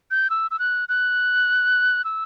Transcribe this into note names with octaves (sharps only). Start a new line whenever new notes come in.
G6
E6
E6
F#6
F#6
E6